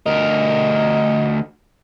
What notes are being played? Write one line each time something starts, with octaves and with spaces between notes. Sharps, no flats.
D2 A#4 D#5